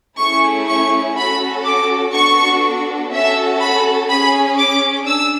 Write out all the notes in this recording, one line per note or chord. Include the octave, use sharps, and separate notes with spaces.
A3 C#4 E4 G#4 C#6
C#6
C#4 F#4 A4 B5
D6
B3 D4 F#4 A4 C#6
C#4 F#4 A4 E5
B5
C#4 G#4 B5
D6
D4 E6